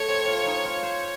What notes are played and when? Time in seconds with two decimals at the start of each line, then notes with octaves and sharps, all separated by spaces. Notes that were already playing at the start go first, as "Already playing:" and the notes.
Already playing: A3 C#5
0.08 C4
0.27 F4
0.46 D#4
0.65 F4
0.83 C5